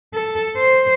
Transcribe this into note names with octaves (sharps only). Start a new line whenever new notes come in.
A4
C5